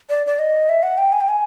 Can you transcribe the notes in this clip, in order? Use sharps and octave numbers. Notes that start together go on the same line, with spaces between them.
D5
D5
D#5
E5
F#5
G5
G#5
G5
G#5